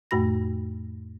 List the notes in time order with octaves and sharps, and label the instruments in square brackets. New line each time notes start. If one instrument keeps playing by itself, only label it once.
[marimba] F2 A2 A3 F#4 B5 A#6